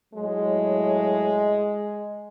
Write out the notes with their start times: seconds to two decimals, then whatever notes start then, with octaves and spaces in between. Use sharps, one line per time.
0.14 A2 F#3 G#3